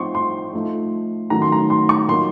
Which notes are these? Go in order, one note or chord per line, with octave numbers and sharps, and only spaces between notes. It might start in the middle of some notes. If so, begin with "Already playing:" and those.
Already playing: F3 C4 D#4 C6 C#6
C6
F3 A3 D#4
D#3 F#3 A3 C#4 A#5
C6
A#5
C6
C#6
A#2 F#3 A#3 D#4 C6